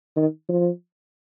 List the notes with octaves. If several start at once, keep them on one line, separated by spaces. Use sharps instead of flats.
D#3
F3